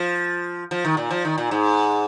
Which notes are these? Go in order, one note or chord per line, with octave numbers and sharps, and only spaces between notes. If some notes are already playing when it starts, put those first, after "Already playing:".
Already playing: F3
F3
D#3
A#2
F3
D#3
A#2
G#2